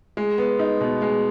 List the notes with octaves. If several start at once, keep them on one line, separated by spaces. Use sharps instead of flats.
G#3
B3
D#4
B2
G#3